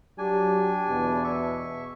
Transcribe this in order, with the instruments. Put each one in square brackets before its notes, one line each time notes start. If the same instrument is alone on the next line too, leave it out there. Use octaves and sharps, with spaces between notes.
[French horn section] F#3 G4 [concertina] D4 G#5
[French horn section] E2 B2
[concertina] E5 C#6